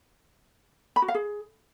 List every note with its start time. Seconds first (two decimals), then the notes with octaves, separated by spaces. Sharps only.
0.96 B5
1.02 F#4
1.08 F5
1.15 G#4